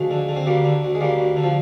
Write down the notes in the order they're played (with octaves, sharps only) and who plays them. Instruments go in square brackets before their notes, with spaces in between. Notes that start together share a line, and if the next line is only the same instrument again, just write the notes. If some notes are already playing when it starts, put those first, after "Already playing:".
Already playing: [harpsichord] D2 F3 G#3
D3
D3
C4
D2 G3 A#3
D3
D2
G#3
D2 G3 A#3
D2
D3
F3